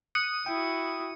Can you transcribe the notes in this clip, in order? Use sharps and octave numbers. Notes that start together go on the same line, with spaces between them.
D#6 F#6 C#7
E4 F#4 G5